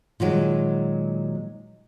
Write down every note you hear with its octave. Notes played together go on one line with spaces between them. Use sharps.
A#2 D#3 F#3 G#3